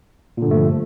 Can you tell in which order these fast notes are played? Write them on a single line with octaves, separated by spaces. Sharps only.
A#2 D3 G2 A3 F3